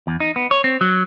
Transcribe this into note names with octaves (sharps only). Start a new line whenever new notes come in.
E2
D#4
B3
C#5
C4
F#3